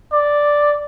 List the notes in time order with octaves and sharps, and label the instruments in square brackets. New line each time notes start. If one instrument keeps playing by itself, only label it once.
[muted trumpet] D5